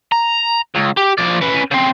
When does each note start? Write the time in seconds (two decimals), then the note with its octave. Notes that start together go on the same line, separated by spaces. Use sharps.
0.12 A#5
0.75 C#2
0.97 G4
1.18 F3 D5
1.41 C#4 B4
1.71 C#3 C4